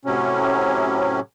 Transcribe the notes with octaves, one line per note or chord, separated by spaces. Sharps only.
A2 C3 F#3 C#4